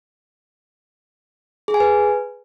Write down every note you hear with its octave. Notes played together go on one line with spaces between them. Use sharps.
G#4
G#5
B4